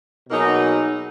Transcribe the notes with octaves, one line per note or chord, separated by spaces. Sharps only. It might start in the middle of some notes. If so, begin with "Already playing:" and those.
B2 F#3 A#3 D#4 G#4